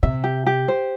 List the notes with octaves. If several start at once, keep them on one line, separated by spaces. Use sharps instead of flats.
C3 E5
G4
G4
C5